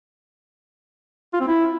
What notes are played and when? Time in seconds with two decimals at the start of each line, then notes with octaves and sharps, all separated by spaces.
1.33 F4
1.40 C4
1.47 E4